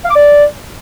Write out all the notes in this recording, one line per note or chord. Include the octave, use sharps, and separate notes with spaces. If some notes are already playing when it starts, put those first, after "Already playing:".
F5
D6
D5